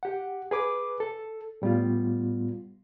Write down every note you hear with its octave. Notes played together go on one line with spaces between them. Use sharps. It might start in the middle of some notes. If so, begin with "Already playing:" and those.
G4 F#5
G#4 B4 D6
A4
A2 G3 B3 F4